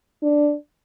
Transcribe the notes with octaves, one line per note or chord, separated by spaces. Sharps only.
D4